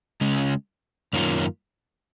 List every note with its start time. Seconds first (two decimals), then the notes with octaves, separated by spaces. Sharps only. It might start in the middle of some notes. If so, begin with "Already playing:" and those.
0.21 C#3 G#3 C#4
1.13 F#2 D#3 A#3 C#4 F4